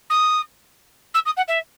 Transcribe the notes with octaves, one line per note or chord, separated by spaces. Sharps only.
D#6
E6
D#6
F#5
E5